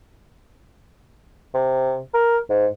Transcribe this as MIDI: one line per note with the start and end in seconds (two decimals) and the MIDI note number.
1.54 1.99 48
2.14 2.38 70
2.50 2.66 44